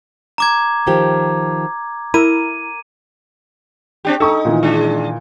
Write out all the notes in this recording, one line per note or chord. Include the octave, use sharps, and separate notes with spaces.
A#5 D6 G#6
D#3 F3 G4
E4 A#4 D#7
C4 D4 G4
D#4 A4 C#6
A#2 D#3 E3
G#3 D4